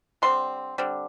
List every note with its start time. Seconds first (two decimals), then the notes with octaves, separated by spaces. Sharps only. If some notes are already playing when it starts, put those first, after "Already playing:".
0.22 D3 G3 C4 C6
0.78 D3 G3 C4